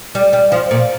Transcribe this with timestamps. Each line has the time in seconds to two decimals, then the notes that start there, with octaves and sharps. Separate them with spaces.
0.15 G3
0.33 G3
0.52 F3
0.71 A#2